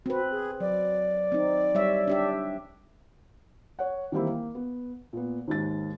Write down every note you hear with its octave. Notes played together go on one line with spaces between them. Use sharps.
C4 F#4 B4
G#4
F#3 D5
C4 D#4
G3 C#5 E5
D4 G4 E5
C#5 F#5
D#3 E3 G3 A#3 C4 E4
A#3
B3
A#2 B3
D#2 G#2 A6